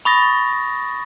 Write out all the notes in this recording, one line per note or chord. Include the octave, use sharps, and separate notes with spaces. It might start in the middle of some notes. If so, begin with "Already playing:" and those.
B5 C#6 D#6 A6 A#6